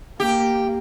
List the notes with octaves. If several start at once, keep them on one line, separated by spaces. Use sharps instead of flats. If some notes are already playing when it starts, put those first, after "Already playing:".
A#3 G4